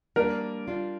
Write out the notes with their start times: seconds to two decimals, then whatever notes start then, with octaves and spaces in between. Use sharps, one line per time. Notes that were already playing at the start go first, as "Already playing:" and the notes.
0.16 G3 A#3 D4 A#4
0.68 G3 D4 F4